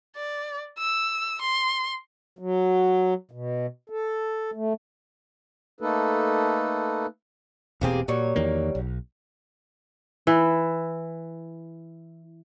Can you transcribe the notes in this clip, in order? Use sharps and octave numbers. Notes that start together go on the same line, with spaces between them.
D5
E6
C6
F#3
B2
A4
A3
A3 A#3 D#4 A4 B4
E1 B2 A#3 C4 G4 G#4
A#2 F#3 G3 C#5
E2 D#3 A#3
B1
E3 E4